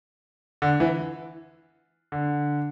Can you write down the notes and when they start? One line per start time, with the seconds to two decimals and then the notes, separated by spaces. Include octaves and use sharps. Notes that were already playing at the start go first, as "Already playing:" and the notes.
0.62 D3
0.80 E3
2.12 D3